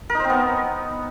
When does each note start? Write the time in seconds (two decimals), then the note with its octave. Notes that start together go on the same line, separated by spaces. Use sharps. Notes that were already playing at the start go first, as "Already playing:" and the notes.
0.10 A#4
0.15 D#4
0.20 C5
0.25 C4
0.30 B3